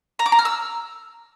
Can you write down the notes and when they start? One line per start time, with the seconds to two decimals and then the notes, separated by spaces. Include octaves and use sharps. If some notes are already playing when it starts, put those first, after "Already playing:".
0.19 A#5
0.26 D6
0.32 A#5
0.39 F6
0.45 E6